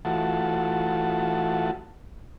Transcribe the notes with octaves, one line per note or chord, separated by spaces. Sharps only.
E3 A3 F4 F#4 F#5 A5